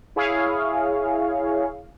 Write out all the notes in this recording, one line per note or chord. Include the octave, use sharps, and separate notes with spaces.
E4 G#4 C#5 F5